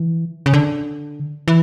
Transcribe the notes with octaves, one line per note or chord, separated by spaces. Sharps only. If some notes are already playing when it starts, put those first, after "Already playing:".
Already playing: E3
C#3
D3
E3